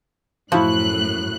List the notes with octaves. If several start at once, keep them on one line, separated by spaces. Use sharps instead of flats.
F#2 A2 F3 E4 F#4 F#6